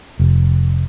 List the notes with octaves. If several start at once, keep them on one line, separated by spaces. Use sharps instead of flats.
F1